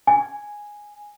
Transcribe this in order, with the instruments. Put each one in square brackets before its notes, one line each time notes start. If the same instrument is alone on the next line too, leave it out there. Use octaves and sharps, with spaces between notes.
[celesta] G#5